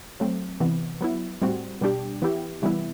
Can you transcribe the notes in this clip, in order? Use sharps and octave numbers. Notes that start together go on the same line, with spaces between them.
F#3 A3 C4
C3 E3 B3
F#3 B3 E4
A2 G3 C4 F#4
B2 G3 D4 G4
E3 B3 E4 G4
C3 E3 G3 B3 E4